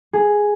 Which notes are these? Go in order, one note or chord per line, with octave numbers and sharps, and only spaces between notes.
G#4